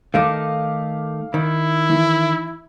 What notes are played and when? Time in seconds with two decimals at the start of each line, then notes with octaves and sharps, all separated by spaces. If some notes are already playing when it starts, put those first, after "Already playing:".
0.14 D#3 A3 D#4 F5 D6
1.34 D#3 E4
1.90 E3